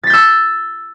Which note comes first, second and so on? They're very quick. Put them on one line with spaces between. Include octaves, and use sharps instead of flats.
A6 B6 G6 E6